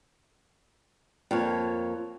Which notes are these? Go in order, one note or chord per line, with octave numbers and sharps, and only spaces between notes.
F2 A#3 C#5